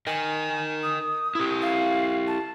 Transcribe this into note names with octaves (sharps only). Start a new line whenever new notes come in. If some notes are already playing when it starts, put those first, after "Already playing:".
A#4 D#5 G#5
D#6
E4 G4
F5
A5